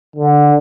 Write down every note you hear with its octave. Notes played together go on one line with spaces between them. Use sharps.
D3